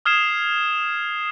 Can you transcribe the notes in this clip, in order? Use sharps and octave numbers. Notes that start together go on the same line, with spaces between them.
D#6 F6 G#6 C7 E7